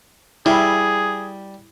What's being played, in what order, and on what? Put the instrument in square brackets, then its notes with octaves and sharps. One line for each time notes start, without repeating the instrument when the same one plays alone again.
[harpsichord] G3 [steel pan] E4 [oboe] G#4